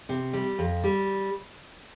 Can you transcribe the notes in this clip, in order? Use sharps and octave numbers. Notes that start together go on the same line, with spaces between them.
C3
G3
F2
G3